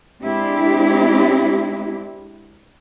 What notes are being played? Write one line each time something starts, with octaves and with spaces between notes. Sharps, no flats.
G#3 C4 D4 E4 G4